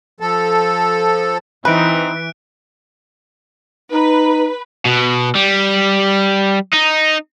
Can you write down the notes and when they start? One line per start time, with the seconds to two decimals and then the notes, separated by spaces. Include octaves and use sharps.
0.20 F3 A4
1.65 E3 C4 D#4 B4 F#6 D7
3.92 D#4 B4
4.86 B2
5.35 G3
6.73 D#4